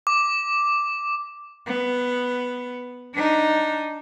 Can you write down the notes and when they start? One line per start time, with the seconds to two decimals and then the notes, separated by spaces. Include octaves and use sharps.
0.07 D6
1.67 B3
3.15 D4 D#4